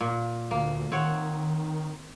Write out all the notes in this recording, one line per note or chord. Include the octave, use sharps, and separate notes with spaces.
A#2
D2 A#3
D#3 C4 C#5 F#5